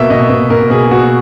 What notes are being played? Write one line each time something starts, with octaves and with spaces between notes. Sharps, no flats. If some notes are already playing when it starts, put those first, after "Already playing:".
Already playing: B2 A#3 E5
B2 D#5
B2
B2 A#4
B2 G#4
B2 F#4